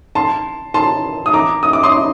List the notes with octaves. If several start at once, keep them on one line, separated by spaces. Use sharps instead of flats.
A5 C6
A5 C6
D#6
A#5 D6
D#6
D6
C6 D#6